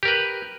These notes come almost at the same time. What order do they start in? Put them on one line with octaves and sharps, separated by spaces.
G4 A#4 B4